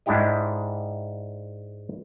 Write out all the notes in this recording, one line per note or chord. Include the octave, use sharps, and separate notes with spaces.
G#2 G#3 D4 E4 G4 D#5